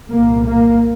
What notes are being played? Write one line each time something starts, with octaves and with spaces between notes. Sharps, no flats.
C2 A#2 A#3
A#3